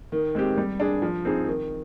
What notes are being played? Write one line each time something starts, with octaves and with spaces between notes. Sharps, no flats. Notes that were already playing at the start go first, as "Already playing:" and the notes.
D#3
G#3 C4 G4
G3
D4 G#4
F3
C4 D#4 G#4
D#3